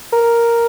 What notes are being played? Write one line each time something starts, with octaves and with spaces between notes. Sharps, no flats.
A#4